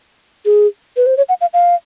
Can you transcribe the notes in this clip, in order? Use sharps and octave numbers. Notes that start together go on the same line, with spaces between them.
G#4
B4
C5
C#5
F#5
F5
F5